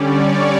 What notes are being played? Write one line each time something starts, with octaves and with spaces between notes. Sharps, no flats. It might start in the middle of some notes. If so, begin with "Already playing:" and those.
Already playing: D3 G3 C#4 D5
C#5